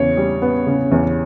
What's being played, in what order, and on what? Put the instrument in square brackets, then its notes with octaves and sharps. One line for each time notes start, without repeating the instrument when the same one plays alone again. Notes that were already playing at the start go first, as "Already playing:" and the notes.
Already playing: [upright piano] E2 C#3 [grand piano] C#5
[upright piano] G3
B3
C#3
E2